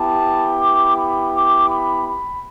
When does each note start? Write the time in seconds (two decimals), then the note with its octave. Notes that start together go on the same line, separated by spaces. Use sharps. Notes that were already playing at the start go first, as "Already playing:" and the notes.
Already playing: B3 E4 G4 A5
0.60 D6
0.96 B5
1.33 D6
1.69 B5
2.06 B5